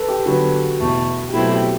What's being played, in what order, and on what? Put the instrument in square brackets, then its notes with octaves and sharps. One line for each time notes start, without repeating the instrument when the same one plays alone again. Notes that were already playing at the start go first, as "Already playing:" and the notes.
Already playing: [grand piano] A4 B4
G4
[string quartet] D3 F#3 B3 [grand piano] F#4
[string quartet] E2 B2 A3
[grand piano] G4
[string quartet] B2 F#3 A3 C4 E4 [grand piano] F#4
[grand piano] G4